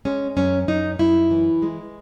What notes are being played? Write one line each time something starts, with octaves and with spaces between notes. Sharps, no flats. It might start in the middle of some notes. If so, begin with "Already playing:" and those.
G#3 C#4
F#2 C#4
F#2 D#4
F#2 E4
E3
G#3